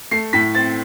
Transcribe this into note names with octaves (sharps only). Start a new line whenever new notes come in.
A3 C7
A2 B6
C4 A6